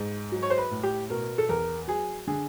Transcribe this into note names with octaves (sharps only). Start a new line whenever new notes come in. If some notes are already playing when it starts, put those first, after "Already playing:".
Already playing: G#2
F#3
C#5
C5
B4
A2
G4
B2 A#4
A4
E2 A#4
F#3 G#4
D3 G#4